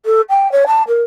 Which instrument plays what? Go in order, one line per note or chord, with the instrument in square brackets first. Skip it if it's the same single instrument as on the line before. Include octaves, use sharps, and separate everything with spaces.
[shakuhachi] A4
G5
C#5
A5
A#4